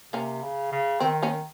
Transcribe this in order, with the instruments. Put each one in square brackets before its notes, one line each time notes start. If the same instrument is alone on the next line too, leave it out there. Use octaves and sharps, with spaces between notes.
[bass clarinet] C3 [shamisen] A#3 C#4
[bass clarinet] C#3
C#3
[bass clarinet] D#3 [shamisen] C4
[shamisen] A#3 C#4